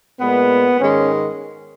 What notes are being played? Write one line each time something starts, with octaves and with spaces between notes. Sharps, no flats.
A#2 G#3 B3
G#2 D#3 G#3 C#4